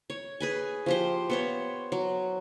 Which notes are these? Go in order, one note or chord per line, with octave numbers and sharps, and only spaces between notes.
C#5
G#4 B4 G#5
F3 G4 C5
B3 C5 C#5
F#3